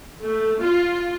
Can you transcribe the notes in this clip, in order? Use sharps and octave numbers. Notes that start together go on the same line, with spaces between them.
A3
F4